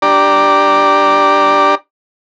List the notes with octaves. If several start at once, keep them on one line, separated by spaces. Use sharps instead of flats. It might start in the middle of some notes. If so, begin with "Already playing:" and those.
D4 G4 D5 A#5